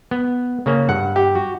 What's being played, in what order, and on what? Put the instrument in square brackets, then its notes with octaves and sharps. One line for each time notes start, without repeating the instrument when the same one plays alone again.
[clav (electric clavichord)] B3
C#3 A#3 C#4
[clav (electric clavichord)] G2 [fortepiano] F#5
[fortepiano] G4
[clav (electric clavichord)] F#4